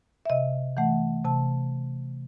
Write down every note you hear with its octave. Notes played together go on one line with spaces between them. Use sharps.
E5
C3 D#5
E3 A3 F#5
C3 A5